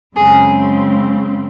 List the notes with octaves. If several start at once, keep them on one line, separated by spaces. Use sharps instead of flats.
F#2 C#3 G#3 C4 G#4